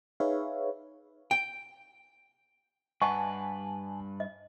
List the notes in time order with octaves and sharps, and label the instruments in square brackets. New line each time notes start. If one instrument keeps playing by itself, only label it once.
[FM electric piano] D#4 G#4 B4 C#5 E5 F5
[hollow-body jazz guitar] G5
[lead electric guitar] G2 B4 [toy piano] D#5 F#5 C#6 [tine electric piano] G#5 A5
[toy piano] D#5